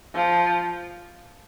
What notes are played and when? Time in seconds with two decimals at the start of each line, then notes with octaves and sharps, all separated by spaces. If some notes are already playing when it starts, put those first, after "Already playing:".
0.15 F3